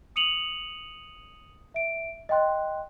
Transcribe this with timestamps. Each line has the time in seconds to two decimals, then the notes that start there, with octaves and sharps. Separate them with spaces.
0.16 D#6 C#7 D#7 F7 F#7
1.74 E5 D7
2.29 D#5 F5 G5 C6 F#6